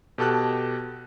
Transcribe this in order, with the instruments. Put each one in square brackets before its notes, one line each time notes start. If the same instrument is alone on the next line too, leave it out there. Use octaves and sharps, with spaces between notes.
[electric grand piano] B2 G4 A4 A5 F#6